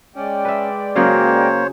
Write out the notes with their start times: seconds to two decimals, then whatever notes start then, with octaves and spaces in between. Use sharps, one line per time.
0.16 G#3 C#4 D5 G5
0.45 B4 E5
0.96 C#3 F#3 A#3 G#4 C5 C#5